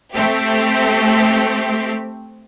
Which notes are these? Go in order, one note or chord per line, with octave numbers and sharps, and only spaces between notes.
A3 C4 G4